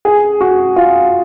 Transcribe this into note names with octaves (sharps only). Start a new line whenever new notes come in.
G#4
F#4
F4